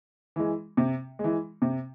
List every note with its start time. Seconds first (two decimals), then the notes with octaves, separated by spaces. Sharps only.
0.36 E3 G#3
0.77 C3
1.19 E3 G#3
1.62 C3